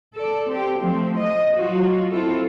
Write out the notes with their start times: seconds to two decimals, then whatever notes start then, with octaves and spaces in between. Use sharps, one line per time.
0.15 A4 D5
0.49 C4 G4
0.79 F3 A3 C4
1.18 D#5
1.56 F#3 F4 F#4
2.11 C4 E4 F4 A4